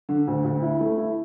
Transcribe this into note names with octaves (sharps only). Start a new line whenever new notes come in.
D3
D2
D2
E4
A3
E4